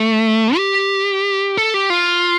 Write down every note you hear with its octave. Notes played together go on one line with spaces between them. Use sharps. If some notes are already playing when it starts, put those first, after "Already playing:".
Already playing: A3
G4
A4
G4
F4